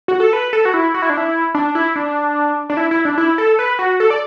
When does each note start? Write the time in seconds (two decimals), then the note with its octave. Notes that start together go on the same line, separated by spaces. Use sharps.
0.08 F#4
0.20 A4
0.33 B4
0.53 A4
0.65 F#4
0.74 E4
0.94 F#4
1.02 E4
1.10 D4
1.17 E4
1.55 D4
1.75 E4
1.96 D4
2.70 D4
2.77 E4
2.91 E4
3.05 D4
3.18 E4
3.38 A4
3.59 B4
3.79 F#4
4.00 A4
4.10 D5